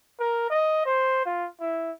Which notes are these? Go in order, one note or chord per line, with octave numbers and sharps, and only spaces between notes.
A#4
D#5
C5
F4
E4